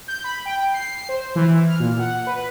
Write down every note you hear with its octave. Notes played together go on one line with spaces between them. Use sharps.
G6
B5
G5
C7
C5
E3
F6
A#2
F#5
B4